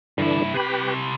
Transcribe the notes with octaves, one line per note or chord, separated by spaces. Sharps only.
G2 D3 E3 D4 E4
C3 G4 B4 B5